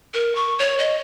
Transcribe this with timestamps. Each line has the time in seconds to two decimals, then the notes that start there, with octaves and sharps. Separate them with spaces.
0.14 A#4
0.35 C#6
0.59 C#5
0.79 D#5